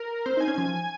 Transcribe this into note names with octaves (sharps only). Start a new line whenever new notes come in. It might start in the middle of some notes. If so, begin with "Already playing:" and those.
Already playing: A#4
C4 C5
D#4 G#5
C#4
F3 G#5